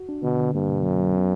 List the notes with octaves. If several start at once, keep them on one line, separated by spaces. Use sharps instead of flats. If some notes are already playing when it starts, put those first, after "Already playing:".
Already playing: F#4
D4
B2 D3
D3
G2 A#3
B2
F#2 F#3
F#3
B3